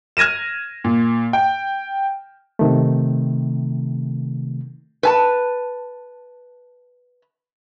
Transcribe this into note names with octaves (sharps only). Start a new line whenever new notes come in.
F6 G#6 A#6 D#7 E7
A#2
G5
C3 D#3 A3
B4 G#5 A5